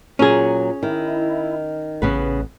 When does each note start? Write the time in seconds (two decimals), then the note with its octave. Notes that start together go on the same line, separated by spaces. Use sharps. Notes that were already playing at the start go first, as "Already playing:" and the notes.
0.19 A#2 F#3 C#4 G#4
0.83 D#3 E4
2.02 A1 C#3 B3 B4